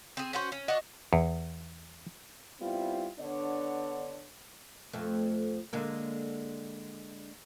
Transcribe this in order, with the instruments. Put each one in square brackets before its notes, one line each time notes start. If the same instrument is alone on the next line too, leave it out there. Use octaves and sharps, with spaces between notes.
[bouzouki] C4 G#4
C#4 F#4 C5
C#4
[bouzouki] D4 F#4 [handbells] D#5
[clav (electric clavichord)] E2
[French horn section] G3 B3 C4 E4 F4
D3 B3 D4 C#5 D5
[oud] F2 A3
D3 G#3 A#3